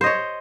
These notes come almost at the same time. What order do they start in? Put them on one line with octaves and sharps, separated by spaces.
C5 D#5 C#5